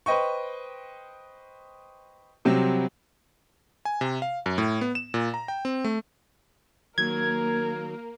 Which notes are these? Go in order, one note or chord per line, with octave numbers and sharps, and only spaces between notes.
B4 C5 D#5 G5 C#6
C3 F#3 G3 C4
G#5
C3
F5
F#2
A2
B3
E7
A#2
A#5
G5
C4
A3
D#3 F#3 A#3 A#4 G#6